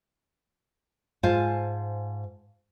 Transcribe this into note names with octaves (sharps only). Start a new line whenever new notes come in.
G#2 F4 C5 F5 G#5 A5